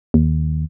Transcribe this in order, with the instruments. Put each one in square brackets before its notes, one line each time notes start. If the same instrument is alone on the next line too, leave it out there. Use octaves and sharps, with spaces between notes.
[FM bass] D#2